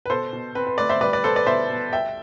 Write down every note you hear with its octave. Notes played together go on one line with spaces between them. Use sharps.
B4
B2 A4 C5
B2
C4 B4
B4
A3 B4 D5
C5 E5
G3 B4 D5
B4 D5
B3 A4 C5
B4 D5
B2 C5 E5
B2
C2 E5 G5